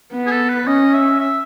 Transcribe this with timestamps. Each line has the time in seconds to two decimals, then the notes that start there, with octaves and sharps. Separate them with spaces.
0.13 B3
0.26 G#4
0.31 A4
0.49 B4
0.67 C#4 D#5
0.94 E5
1.21 E5